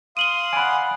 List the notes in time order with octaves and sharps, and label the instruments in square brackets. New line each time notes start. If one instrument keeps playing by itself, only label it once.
[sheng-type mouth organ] F5 C6 D#6 [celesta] D#7 F#7 G7
[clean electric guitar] D5 F#5 [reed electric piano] G#5 B5